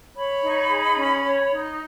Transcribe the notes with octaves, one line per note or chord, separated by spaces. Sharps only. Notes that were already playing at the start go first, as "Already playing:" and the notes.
C#5 B5
D#4
G#4
C#4
C#5
D#4